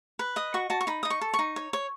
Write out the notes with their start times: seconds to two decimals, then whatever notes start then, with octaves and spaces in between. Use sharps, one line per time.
0.19 B4
0.36 D#5 D#6
0.54 F#4 C#6
0.70 F#4 A5
0.81 C#6
0.87 D#4 B5
1.03 D#4 D#6
1.10 C#6
1.21 A4
1.34 C#6
1.39 D#4
1.56 C#5
1.73 C#5